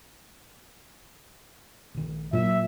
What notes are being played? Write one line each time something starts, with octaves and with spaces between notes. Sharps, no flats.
A#1 D#3
A#2 F#3 E5